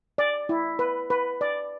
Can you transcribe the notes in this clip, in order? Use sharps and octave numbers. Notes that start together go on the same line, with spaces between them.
D5
E4
B4
B4
D5